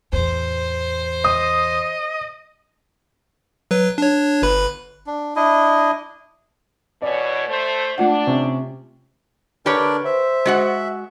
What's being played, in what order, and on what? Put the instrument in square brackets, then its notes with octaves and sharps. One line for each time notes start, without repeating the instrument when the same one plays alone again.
[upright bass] E2 A2 [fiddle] C5
[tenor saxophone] D#5 [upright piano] D#6
[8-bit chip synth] F#3 B4
D4 C#5
G1 B4 B5
[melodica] D4
D4 E4 D#5
[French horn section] B2 E3 C#5 [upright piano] D5
[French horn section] A3 C5
[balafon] A3 F4 F#5 [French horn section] D4
[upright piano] C3 C#4
[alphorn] D3 [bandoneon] D4 A#4 D5 [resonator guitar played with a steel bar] G4 B4 C#5
[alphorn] C5 [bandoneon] E5
[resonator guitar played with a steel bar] G#3 F#4 F#5